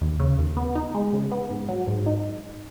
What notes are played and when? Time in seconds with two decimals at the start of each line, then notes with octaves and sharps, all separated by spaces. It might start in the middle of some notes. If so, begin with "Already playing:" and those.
0.01 D#2
0.20 C#3
0.39 D#2
0.57 B3
0.75 D#4
0.94 G#3
1.13 C#3
1.31 B3
1.50 G#2
1.69 F#3
1.87 G#2
2.06 D#4